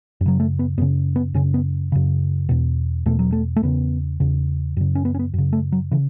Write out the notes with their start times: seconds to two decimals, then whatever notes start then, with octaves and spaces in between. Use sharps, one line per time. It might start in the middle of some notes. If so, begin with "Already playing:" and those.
0.21 F#2
0.26 C#3 F#3
0.40 A3
0.59 B3
0.78 F#2 B3
0.82 C#3
1.16 B3
1.34 F#2 C#3 C#4
1.54 B3
1.92 F#2 C#3
2.49 E2 B2
3.06 E2 B2 A3
3.19 F#3
3.32 A3
3.56 A3
3.63 E2 C#3 B3
4.20 E2 C#3
4.77 F#2 C#3
4.95 C#4
5.05 B3
5.15 C#4
5.19 B3
5.34 F#2 C#3
5.53 A3
5.72 F#3
5.91 C#3 E3